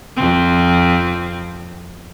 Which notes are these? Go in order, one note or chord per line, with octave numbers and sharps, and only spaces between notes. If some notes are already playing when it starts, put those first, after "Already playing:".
F2 C4